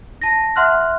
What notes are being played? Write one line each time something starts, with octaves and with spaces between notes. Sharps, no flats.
A5 A#6
E5 F#5 C6 F6 F#6